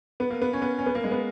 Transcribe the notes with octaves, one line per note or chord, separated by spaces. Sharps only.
B3
A#3
B3
C#4
B3
C#4
B3
A#3
G#3
B3